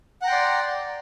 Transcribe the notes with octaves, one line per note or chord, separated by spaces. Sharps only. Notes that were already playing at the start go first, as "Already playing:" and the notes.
D5 F#5 G5 A#5 C6